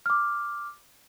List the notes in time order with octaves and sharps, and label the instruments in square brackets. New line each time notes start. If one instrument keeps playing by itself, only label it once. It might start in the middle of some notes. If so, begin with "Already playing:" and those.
[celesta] D6 F6